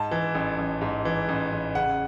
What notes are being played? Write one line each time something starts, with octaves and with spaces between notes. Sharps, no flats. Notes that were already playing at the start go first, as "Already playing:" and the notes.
Already playing: G#2 A5
E3
A1
A1
G#2
E3
A1
A1
C#3 F#5